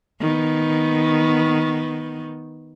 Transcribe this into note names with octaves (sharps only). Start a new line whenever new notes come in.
D#3 B3